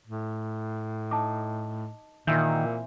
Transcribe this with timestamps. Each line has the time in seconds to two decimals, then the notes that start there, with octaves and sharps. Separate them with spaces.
0.07 A2
1.11 D#4 A5 D6
2.27 A#2 D#3 E3 C4 F#5 E6 G6